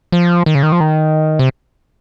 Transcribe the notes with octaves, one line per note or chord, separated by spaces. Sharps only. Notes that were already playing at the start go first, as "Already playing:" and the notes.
F3
D#3
C#3
D#3
F3
D#3
C3